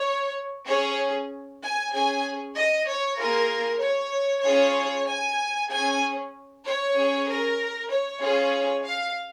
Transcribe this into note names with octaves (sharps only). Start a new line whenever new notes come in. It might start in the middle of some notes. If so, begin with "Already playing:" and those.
Already playing: C#5
C#4 G#4 C#5
G#5
C#4 G#4 G#5
D#5
C#5
A#3 F4 G#4 A#4
C#5
C#4 F4 G#4 C#5
G#5
C#4 G#4 G#5
C#5
C#4 G#4
A#4
C#5
C#4 F4 G#4
F5